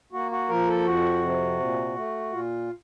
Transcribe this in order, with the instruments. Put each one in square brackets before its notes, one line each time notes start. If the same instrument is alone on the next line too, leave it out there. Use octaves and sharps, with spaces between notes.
[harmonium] A#3 F#4
F#4
F3 A#4
A4
F2 F#4
C3
A#2
A3
A#2 F4